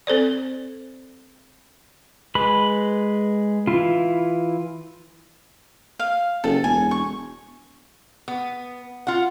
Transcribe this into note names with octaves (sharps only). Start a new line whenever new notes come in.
C4 A4 C5 D5
G#3 B4 B5
E3 E4 F4
F5
F#1 A4
E1 G#5
C#6
B3
F4 F#5